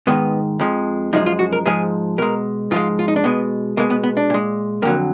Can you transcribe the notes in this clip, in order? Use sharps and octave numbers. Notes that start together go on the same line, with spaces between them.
G#2 D#3 G#3 B3
F2 F3 G#3
F#2 F3 G#3 D#4
F4
F#4
A#4
G#2 F3 G#3 G#4
B2 G#3 A#4
G#2 F3 G#3 F4
F4
D#4
D4
B2 G#3 B3
B2 G#3 A#3
B3
B3
D4
A#2 G#3
F2 D3 F#3 A#3